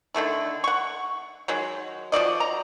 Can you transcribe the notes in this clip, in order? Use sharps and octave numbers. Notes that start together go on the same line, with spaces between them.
D3 D#3 A3 E4
F#5 C#6
D#3 F#3 G#3
F3 F#4 D5 D#5
A#5